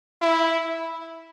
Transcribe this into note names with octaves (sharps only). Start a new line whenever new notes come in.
E4